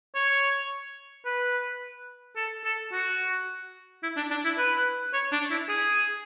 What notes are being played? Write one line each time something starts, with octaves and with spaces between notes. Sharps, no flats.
C#5
B4
A4
A4
F#4
E4
D4
D4
E4
B4
C#5
D4
E4
G#4